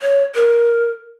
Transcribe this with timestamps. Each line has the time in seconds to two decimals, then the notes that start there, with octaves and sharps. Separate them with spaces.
0.02 C#5
0.35 A#4